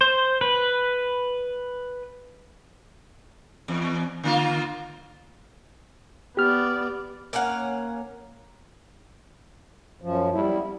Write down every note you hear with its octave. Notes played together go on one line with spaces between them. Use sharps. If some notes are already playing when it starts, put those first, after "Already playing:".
C5
B4
E2
D3 A#3 F4
B3 G4 D5 F6
A#3 C#4 F5 F#5
F#2 F3
G3 E4